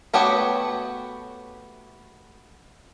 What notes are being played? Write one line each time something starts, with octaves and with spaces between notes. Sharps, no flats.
A3 B3 F#4 G4 C#5